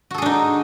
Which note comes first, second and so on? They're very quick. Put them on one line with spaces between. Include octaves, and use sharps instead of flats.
F#4 A4 G#4 D4 D#4